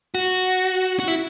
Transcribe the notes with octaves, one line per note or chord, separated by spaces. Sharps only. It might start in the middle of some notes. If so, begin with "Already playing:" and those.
F#4
F#4
E4